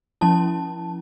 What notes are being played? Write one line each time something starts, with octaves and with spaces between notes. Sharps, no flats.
F3 C#4 E4 A5